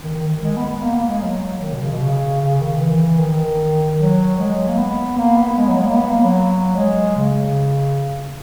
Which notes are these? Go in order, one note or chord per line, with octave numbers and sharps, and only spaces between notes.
D#3
D#3
G#3
B3
B3
A#3
A#3
G#3
F#3
D#3
B2
C#3
B2
C#3
C#3
D#3
E3
D#3
F#3
G#3
A#3
B3
A#3
B3
G#3
F#3
G#3
A#3
B3
A#3
F#3
G#3
C#3